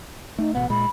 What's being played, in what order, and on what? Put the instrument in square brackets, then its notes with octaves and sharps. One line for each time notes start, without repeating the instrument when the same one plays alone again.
[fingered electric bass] A3 [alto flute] D#4
[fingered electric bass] A1 B2 B3 [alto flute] F#5
[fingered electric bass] A#2 G#3 [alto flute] B5